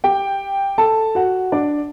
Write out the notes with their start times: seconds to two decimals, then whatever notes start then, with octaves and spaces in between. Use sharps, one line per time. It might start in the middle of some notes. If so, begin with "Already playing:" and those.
0.04 G4 G5
0.78 A4 A5
1.15 F#4 F#5
1.52 D4 D5